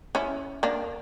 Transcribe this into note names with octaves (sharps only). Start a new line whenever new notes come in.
C#4 E4
A#3 D4